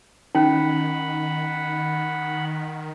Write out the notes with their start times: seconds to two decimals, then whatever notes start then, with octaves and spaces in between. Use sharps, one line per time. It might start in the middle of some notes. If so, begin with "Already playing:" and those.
0.35 D#3 C#4 D#4 F#5 B5